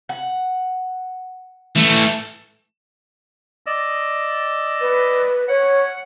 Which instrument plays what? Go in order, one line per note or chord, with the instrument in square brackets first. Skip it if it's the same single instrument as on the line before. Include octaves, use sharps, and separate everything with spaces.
[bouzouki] F#5
[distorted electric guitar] E3 A3
[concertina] D5 D#5 E6
[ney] B4
[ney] C#5 [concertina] F#5